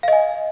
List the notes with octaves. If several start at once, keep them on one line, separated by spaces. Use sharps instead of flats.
D#5 F5 G#5